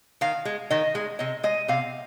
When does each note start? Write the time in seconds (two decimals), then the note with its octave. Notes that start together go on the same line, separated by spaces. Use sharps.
0.21 D#3 F5
0.45 G#3
0.70 D#3 D#5
0.95 G#3
1.19 C3 D#5
1.43 G#3 D#5
1.68 C3 F5